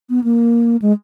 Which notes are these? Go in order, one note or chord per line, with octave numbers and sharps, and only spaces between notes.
B3
A#3
G#3